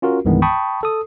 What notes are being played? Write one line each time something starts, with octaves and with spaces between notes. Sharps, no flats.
C#4 F4 F#4 A#4
C2 G2 D#3 E3 G#3 B3
G5 A5 B5 C#6 D#6
A4 D#6